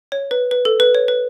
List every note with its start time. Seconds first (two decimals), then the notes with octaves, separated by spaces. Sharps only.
0.12 C#5
0.31 B4
0.51 B4
0.65 A4
0.80 B4
0.95 C#5
1.08 B4